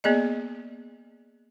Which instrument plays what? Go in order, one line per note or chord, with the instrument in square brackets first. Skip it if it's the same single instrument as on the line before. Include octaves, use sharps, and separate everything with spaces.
[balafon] A#3 B3 G#4 D5 D#5